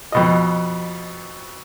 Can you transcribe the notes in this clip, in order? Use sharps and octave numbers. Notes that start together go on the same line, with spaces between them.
F2 B2 D#5